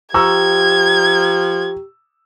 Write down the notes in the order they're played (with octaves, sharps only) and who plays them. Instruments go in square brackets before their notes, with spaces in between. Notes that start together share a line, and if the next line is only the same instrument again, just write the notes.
[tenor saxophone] F3 [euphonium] G4 [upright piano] A#5 C#6 E6 [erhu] G#6